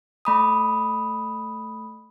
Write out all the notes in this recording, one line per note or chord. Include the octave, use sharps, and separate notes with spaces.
A3 B5 D#6